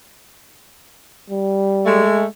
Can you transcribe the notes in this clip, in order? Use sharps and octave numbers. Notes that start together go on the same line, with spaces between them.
G3
G#3 A3